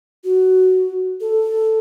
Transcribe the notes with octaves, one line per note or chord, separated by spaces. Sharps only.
F#4
A4